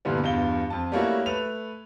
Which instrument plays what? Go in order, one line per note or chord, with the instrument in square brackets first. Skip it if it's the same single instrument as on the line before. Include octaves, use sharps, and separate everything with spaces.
[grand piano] G2 A#2 D3 E3 G3 B3
E2 G2 F4 G7
F2 A5
G3 A3 A#3 C#4 E4 F#4
A3 B4 F7